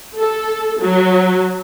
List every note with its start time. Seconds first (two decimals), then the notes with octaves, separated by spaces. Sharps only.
0.17 A4
0.81 F#3